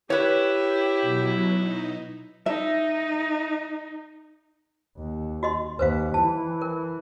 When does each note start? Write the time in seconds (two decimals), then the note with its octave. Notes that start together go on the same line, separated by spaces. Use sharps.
0.10 E4 G4 B4 C#5
1.02 B2 F#3
1.53 D#4
2.46 D#4 E5
4.98 D#2
5.43 F#4 D#5 C6
5.79 D#2 B4 C5 F5
6.14 E3 A5
6.62 A#4